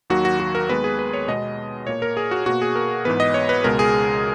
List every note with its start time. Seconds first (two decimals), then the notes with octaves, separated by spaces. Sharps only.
0.10 D#2 D#3 F#3 A#3 F#4
0.25 F#4
0.40 F#4
0.55 A#4
0.69 D#2 D#3 G#3 B3 B4
0.84 G#4
0.99 B4
1.13 C#5
1.28 B2 G#3 B3 D#5
1.87 A#2 A#3 C#5
2.02 A#4
2.17 G#4
2.31 F#4
2.46 B2 A#3 F#4
2.62 G#4
2.75 A#4
3.05 G#2 E3 B3 B4
3.20 D#5
3.34 C#5
3.49 B4
3.64 C#2 B2 G#3 A#4
3.79 G#4